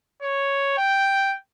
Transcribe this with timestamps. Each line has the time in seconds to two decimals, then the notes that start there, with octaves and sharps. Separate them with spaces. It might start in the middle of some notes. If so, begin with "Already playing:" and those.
0.22 C#5
0.78 G5